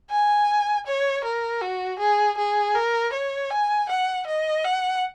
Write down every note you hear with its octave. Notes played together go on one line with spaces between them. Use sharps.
G#5
C#5
A#4
F#4
G#4
G#4
A#4
C#5
G#5
F#5
D#5
F#5